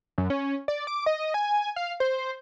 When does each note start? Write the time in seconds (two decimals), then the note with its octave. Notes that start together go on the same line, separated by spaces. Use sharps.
0.18 F#2
0.30 C#4
0.68 D5
0.87 D6
1.06 D#5
1.34 G#5
1.76 F5
2.00 C5